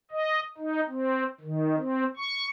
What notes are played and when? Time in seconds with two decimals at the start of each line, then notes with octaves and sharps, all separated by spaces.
0.11 D#5
0.58 D#4
0.88 C4
1.41 D#3
1.77 C4
2.17 C#6